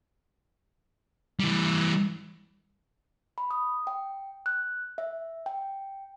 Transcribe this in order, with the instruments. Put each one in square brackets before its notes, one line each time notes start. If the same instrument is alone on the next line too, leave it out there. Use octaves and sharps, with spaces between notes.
[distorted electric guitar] E3 G3
[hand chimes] B5
D#6
G5
F#6
E5
G5